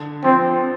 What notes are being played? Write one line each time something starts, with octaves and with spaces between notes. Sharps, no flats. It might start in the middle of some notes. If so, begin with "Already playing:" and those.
Already playing: D3
F3 C4